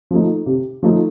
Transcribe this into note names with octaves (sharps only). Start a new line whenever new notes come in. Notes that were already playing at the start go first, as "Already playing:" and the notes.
F3 A3 D#4
C3
F3 A3 D#4